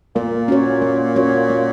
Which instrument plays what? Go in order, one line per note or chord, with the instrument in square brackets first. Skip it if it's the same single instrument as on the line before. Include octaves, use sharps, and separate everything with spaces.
[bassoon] A#2 [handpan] A#3
[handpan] C#4 F#4 C#5
A#3
C#4 F#4 C#5
A#3